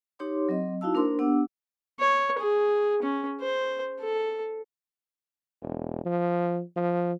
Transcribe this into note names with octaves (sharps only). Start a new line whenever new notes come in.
D#4 G4 C#5 C6 D6
F#3 C4 D#5
D#4 E4 F#4 F5 A5 E6
A#3 D4 A#4 C5 C6 D6
B3 D4 G4 F#5 D6 E6
C#5
G#4
C#4
C5
A4
E1
F3
F3